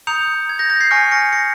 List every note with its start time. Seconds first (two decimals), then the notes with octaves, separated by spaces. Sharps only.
0.07 A#5 D#6 G6 C#7 F7
0.49 G#6
0.59 G6 A#6
0.70 G6 A#6
0.80 G#6 C7
0.91 G#5 C#6 F6 A#6 C#7
1.11 A#6 C#7
1.33 A#6 C#7